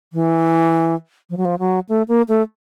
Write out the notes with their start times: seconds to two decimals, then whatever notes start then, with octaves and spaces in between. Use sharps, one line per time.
0.13 E3
1.30 F3
1.37 F#3
1.45 F3
1.59 F#3
1.89 A3
2.08 A#3
2.28 A3